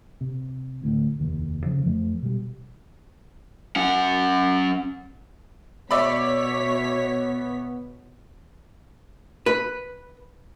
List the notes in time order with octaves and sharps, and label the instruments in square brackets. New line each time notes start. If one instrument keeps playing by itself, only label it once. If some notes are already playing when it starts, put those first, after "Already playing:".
[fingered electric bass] C3
D2 A2
F1 D#2
C#3 F3
F2 F3 A3
B2 G3
[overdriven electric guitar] C#4 F#5
[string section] B2 C#5 B6 [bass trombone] B3 [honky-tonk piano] D5 E5 B5
[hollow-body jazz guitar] B4